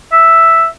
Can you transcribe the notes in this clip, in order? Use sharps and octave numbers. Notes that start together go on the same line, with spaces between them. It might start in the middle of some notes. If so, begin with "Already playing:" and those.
E5